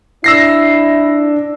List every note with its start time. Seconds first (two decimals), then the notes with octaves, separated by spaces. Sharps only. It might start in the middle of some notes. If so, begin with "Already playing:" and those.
0.24 D4 E4 E6 A#6 C7